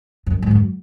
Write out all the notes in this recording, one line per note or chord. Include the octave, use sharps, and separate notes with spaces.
F#2
G#2
F#2